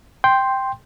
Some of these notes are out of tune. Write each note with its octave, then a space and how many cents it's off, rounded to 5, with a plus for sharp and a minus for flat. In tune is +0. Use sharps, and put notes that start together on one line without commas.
G5 +0 C6 +0